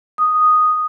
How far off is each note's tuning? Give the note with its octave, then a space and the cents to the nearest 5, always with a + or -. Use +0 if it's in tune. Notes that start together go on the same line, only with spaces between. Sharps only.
D#6 -5